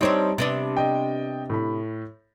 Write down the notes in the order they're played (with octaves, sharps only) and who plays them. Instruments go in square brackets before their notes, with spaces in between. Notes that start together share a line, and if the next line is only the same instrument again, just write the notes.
[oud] G3 C4 D4 [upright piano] D#4 C5 C#5
[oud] C3 B3 D4 [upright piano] A6
[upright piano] D#5 G5
A2 B5